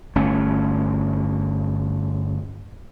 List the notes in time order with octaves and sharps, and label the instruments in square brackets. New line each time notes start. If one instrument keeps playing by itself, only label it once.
[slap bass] G1 A3 C#4